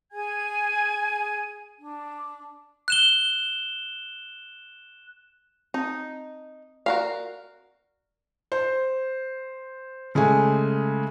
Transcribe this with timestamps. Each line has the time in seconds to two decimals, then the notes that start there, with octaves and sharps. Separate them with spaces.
0.11 G#4 G#5 G#6
1.78 D4
2.88 F#6 E7 G7
5.74 C4 D#4
6.86 F#4 A#4 D5 F5
8.52 C5
10.15 C#3 G#3 A3 G#5